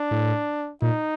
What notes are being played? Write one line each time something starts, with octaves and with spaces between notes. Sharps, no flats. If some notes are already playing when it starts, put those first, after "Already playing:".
Already playing: D4
A2
A#2 D#4